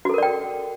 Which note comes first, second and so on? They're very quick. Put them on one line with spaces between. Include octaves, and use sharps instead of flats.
F#4 A4 A#4 D5 G5